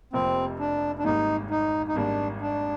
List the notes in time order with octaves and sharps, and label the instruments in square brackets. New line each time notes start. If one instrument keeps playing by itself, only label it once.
[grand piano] F1 F2 C3 F3 A#3 [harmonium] C4
[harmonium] D4
D4
[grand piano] G#1 G#2 G3 A#3 [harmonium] D#4
[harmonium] D#4
D#4
[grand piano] G#1 G#2 G3 A#3 [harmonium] D4
[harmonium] D4